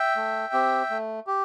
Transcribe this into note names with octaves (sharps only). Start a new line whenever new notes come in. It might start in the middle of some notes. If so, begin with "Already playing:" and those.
Already playing: E5 G5
A3
C4 G4
A3
G4